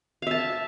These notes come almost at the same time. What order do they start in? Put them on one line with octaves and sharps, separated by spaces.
F5 E5 A5